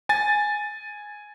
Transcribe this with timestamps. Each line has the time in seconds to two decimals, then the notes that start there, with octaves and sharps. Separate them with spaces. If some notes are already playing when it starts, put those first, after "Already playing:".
0.09 G#5 A6